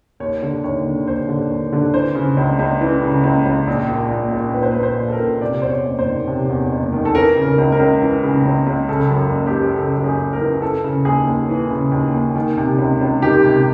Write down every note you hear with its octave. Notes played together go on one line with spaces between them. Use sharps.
D#2 C#5
D3
D#2 C#5
D3
D#2 C5
D3
D#2
D3
E3 C5
C#3
C#2
C#2
E3
C#3
C#2
C#2
A#1
A#2
A#1
A#2
A#1 B4
C5
B4
A#2
C5
A#1
A4
A#4
A#2
C3 D5
E2 C5
C#5
F#1
C5
D#3
C3
E2
F#1
D#3
A4
E3 A#4
C#3
A#4
C#2
A#4
C#2
E3
C#3
C#2
C#2
C#3 A4
F#2
F#1
G4
E3
C#3 A4
F#2
G#4
F#1
A#4
E3
E3 A4
C#3
D#2 G#4
D#2
E3
C#3
D#2
D#2
D#3
C3
C#2
C#2
D#3 G4
C3